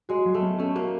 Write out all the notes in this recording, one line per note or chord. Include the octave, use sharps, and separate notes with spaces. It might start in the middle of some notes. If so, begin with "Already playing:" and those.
G#3 F#4
F#3
A3
B3
A3 C#4
A#3 F#4